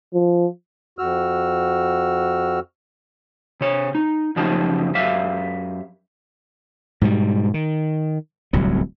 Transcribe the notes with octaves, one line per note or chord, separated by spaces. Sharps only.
F3
F2 F#4 E6 F6
C3 C#5
D#4
F#2 C#3 F3 D#4 G4 A5
F#2 G4 E5 F5
G#2 B2 D#3 G3
D#3
D1 C2 F#3